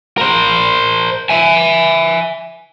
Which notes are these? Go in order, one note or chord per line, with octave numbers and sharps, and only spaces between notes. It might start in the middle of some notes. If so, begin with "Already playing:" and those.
A#4 C5
E5 G#5